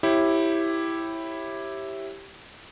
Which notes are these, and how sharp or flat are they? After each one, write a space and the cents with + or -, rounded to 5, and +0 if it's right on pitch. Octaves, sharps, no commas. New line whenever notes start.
E4 +0 G4 +0 C#5 -30